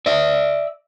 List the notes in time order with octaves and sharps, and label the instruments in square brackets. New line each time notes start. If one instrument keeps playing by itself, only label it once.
[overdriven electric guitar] D5 E5